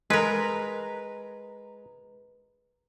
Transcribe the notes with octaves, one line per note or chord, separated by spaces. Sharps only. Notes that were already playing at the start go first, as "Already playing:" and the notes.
G#3 A#4 B4